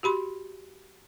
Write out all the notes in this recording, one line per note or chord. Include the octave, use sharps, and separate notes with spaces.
F#4 G4 B5 C6